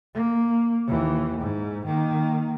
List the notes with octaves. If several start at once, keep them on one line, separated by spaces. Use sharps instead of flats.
A#3
D#2 E3
G#2
D#3 A#3